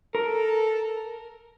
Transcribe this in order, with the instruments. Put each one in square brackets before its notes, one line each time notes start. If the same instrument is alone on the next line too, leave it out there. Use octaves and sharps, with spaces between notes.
[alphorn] A4 [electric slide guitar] A#4